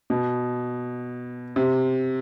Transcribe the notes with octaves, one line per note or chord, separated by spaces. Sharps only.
B2
C3